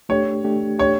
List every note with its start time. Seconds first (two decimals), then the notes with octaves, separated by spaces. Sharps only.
0.09 A3 D4 G4 C#5
0.44 A3 D4 G4
0.79 A3 D4 G4 C#5